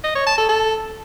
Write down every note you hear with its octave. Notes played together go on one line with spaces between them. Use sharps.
D#5
C#5
A5
A4
A4